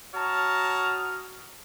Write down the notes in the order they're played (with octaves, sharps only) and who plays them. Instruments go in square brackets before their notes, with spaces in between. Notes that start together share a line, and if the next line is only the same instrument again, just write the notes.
[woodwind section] F#4 D#6 F6 [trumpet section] C#5 A5 A#5